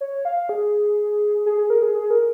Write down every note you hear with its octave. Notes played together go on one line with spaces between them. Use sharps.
C#5
F5
G#4
G#4
G#4
A#4
G#4
G#4
A#4